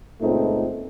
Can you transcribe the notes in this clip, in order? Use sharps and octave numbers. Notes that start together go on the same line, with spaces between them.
C#2 A#2 A3 C4 D#4